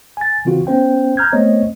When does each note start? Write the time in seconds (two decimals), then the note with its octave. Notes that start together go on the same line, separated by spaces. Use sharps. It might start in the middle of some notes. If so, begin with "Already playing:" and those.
0.17 G#5 A6
0.45 C#3 E3 C4 F4 F#4
0.67 B3 C#4 C5 G5
1.17 A#5 F6 G6 G#6
1.32 A3 B3 C4 C5 C#5 D#5